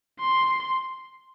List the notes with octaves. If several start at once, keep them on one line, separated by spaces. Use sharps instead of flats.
C6